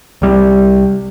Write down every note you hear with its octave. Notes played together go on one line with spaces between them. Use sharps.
C2 G3